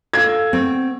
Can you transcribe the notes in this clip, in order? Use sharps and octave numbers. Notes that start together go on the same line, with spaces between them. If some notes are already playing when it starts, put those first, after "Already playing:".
A4 F5 E6 G#6
B3 C4 D7